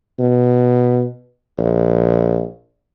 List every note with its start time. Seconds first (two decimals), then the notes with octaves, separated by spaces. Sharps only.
0.19 B2
1.58 A#1